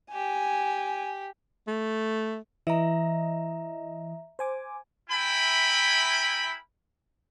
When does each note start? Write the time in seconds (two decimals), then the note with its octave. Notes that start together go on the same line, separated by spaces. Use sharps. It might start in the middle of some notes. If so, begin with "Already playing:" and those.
0.12 G4 G#5
1.67 A3
2.67 E3 D#5 E5 A#5
4.39 C5 G#5 D6
5.10 E4 A#4 E5 G5 G#5 B5